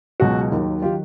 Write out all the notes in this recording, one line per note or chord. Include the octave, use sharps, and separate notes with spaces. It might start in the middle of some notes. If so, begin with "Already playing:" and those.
C#2 B2 F#3 F#4
D#2 D#3 F#3
D#3 F#3 F4 G4